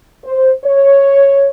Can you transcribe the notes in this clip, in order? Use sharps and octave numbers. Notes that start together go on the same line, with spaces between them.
C5
C#5